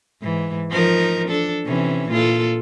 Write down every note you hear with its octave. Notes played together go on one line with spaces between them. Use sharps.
G#2 E3
F3 D#4 A#4
D4 A4
C3 E3 C#4
A#2 F4 A4